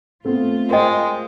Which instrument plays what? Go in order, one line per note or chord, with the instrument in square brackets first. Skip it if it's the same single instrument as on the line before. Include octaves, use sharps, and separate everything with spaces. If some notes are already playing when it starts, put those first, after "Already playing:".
[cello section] A3 F4 [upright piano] B3 C4 A4
[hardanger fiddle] G#3 [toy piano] A#4 D#5 [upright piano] C5 G5